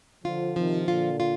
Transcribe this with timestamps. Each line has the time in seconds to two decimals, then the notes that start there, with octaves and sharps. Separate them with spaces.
0.24 D3 F3 F4
0.56 C3 D#3 F3
0.88 A#2 D3 F4
1.20 F4